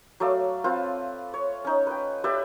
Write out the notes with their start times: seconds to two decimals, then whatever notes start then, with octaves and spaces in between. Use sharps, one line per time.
0.20 F#3 A3 D5 F5
0.64 C4 F4 B4 A5
1.34 C#5
1.65 C#4 D#4
1.87 B4 G5
2.24 G4 B4 D5 E5